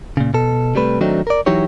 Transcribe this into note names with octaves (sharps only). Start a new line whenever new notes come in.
A#2 C#3
B2 A4
C3 G3 A3 B4
D#3 F#3 A3 C4 D4 D#4
A#4 D5
E3 F#3 D#4 E4 G4 C#5